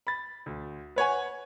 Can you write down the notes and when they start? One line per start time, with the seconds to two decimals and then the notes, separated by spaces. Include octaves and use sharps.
0.07 B5 A6
0.46 D2
0.96 B4 C#5 F#5 G#5